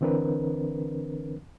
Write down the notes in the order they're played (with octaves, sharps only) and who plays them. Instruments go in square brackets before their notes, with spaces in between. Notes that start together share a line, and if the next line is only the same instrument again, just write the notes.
[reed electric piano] D3 E3 C4 D4 A#4 B4